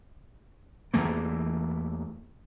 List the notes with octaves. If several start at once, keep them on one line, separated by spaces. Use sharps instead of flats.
E2 E3 A3 A#3